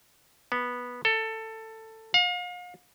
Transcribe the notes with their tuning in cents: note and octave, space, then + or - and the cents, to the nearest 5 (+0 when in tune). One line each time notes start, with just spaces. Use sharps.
B3 -10
A4 +15
F5 +40